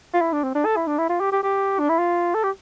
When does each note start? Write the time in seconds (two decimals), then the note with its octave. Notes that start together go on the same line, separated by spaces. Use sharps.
0.14 F4
0.21 E4
0.32 D4
0.43 C4
0.55 D4
0.65 A4
0.76 E4
0.87 D4
0.98 E4
1.09 F4
1.20 G4
1.32 G4
1.43 G4
1.79 D4
1.89 E4
1.99 F4
2.34 A4
2.44 G4